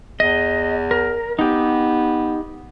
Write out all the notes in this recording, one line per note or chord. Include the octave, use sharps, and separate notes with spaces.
E2 D#5
A#4
B3 D#4 G4